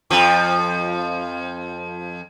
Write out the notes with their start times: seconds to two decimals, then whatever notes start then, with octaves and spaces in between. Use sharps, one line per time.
0.10 F2 F3